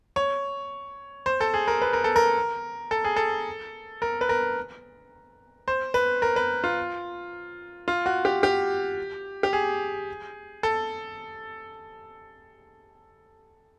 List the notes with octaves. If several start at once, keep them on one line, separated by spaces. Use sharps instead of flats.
C#5
C5
A4
G#4
A#4
B4
A#4
A4
A#4
A4
G#4
A4
A#4
B4
A#4
C5
B4
A#4
B4
F4
F4
F#4
G4
G4
G4
G#4
A4